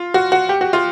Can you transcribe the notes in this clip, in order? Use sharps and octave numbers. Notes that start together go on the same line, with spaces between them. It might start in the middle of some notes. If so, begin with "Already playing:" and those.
Already playing: F4
F#4
F#4
G4
F#4
F4